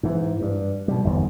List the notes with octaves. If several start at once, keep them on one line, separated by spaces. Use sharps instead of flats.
G#2 E3
G2
B2 G3
G1 E2 G#2